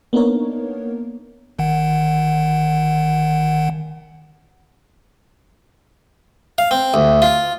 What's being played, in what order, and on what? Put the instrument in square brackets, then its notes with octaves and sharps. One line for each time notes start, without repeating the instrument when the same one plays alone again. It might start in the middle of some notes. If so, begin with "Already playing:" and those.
[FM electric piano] A#3 B3 D4 D#4 A#4 C#5
[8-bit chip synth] G1 D#3 F#5
[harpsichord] F5
C4
D2
F4